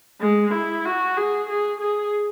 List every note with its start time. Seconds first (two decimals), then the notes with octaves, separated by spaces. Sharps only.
0.21 G#3
0.54 E4
0.85 F#4
1.17 G#4
1.49 G#4
1.81 G#4